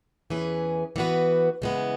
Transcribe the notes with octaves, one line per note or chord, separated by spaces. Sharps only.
E2 E3 C#4 G#4 B4
E3 B3 F#4 B4
C#3 E3 G#3 B3